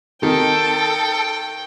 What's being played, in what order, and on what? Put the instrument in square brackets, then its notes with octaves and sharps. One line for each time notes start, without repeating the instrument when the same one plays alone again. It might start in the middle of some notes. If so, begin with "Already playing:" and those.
[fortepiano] D#3 [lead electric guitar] A4 [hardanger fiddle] G5